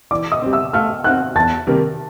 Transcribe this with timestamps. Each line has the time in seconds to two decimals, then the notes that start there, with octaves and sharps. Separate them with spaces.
0.11 E3 D5 D6
0.32 D#5 D#6
0.42 G3 C4
0.53 E5 E6
0.73 A3 F5 F6
1.04 C4 D#4 F#5 F#6
1.35 E2 A5 A6
1.67 C3 D#3 G3 A#3